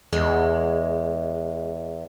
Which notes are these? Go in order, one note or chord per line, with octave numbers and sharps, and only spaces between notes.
E2 G#3